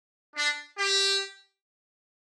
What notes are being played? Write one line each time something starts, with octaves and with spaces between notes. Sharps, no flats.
D4
G4